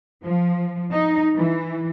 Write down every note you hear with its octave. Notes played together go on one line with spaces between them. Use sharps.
F3
D#4
E3